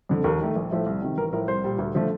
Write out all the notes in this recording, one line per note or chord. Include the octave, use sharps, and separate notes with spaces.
F2 D3
D#2 A#4
D#3 A3
A#1
A2 F3 A3
C2
C3 D#3
A1 A#4
A2 F3 A#4
C2 C5
A#2 G3
D2
D3 F3 A3